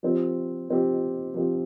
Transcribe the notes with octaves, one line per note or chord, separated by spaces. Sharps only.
F3 C4 G4
F3 C4 G4
F3 C4 G4